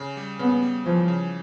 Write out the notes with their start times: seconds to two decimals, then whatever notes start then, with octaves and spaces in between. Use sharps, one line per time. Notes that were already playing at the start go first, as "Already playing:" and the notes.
Already playing: C#3
0.17 G3
0.39 C#3 B3
0.62 G3
0.85 E3 F3
1.08 C#3